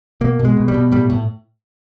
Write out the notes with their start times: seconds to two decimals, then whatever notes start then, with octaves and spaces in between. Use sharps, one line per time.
0.21 B2 A#3
0.39 B2
0.45 G#3
0.57 B2
0.68 G3
0.74 B2
0.92 A2 G3
1.10 A2